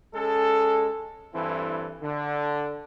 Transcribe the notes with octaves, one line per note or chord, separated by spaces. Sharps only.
G#3 C#4 A4
G2 E3 C4 E4 A4
D3